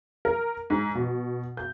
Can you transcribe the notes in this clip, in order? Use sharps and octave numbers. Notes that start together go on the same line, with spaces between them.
A#4
G#2
B2
G6